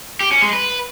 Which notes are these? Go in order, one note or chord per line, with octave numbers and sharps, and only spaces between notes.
G4
C#4
G#3
B4